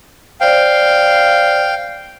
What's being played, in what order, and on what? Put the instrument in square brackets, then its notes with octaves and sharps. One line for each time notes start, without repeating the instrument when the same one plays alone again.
[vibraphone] C5 D5 [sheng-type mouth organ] F5 G5